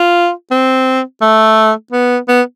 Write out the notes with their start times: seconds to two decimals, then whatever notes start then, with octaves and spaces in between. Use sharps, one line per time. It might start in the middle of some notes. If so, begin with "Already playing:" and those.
Already playing: F4
0.51 C4
1.22 A3
1.93 B3
2.29 B3